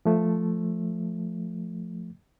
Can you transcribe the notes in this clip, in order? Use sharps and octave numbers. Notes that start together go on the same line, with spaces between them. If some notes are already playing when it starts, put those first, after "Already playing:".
F3 A3